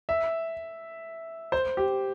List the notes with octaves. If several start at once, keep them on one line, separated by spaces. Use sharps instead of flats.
E5
C5
G4